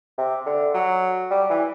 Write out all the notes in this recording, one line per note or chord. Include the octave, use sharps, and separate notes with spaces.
C3
D3
F#3
G3
E3